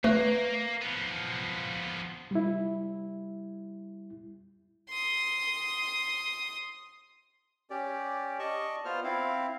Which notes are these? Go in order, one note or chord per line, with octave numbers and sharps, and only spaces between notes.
A3 A#3 B4
F3 B3
G3 E4
C6 D#6
C#4 G4 D5
D5 D#5 A5 C#6
B3 F4 C5 F6
C4 E4 F5